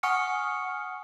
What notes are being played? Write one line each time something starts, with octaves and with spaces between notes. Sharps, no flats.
F#5 G#5 C#6 D#6 F6 C#7